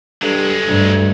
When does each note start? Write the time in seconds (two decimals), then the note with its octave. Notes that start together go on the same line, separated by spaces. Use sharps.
0.22 G2 F#3 G#3 A4
0.68 D2 G2